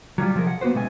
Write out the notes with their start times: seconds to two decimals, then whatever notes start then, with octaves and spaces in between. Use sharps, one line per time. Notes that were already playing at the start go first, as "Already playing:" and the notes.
0.18 F#3 G3 F4
0.35 C3 F3 F#3 F4 G#4 A#4
0.47 F#5
0.61 A#3 B3 F#4 B4 C5
0.75 B2 G#3 A3 C#4 G#5